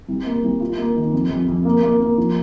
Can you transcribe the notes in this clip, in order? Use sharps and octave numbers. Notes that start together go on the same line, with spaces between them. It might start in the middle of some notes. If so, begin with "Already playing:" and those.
C2
A#3
C2
F4
A#3
D#3
F2
F2
F2
A#3
A#3
A#3
F3